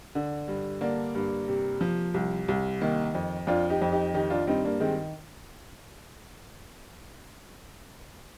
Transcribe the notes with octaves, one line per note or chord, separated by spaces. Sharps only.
D3
G2
D3 A#3 D4
G2
C3
F3
C2
C2
D#3 A#3
F2
F2 D4 F4
D#4 G4
F2
D#4 G4
D#3 D#4 G4
D4 F4
G2 C4 D#4
A#3 D4
D#3 G#3 C4